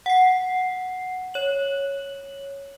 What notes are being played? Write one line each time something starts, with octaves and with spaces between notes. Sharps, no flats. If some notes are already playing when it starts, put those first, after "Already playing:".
F#5 C7
C#5 F#7